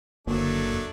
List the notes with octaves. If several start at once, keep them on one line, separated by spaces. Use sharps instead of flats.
F#1 D3 F#3 A3 A#3 D4
E2